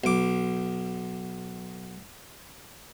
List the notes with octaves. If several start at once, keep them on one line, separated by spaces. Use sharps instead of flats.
B1 D6